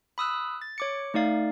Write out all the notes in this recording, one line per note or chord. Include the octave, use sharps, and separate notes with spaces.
B5 D#6 E6 F#6
A6
C#5 D6 C#7
A3 D#4 D5 F5